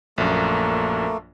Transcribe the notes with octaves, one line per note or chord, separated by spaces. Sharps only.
A#1 F#2 A3 A#3